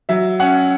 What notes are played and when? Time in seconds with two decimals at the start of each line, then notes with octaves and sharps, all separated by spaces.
0.09 F#3 E5
0.40 C#4 F#5